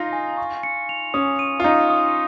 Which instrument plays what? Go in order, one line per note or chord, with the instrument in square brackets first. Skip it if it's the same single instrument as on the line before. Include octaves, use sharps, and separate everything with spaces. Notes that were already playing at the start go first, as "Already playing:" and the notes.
Already playing: [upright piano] D#4 F4 [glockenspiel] A#6
[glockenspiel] G#5
C#6
C#7
F7
[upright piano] C#4 [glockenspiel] D#6
[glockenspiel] D#7
[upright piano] F4
[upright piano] D#4 [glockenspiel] D#6
[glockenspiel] D#6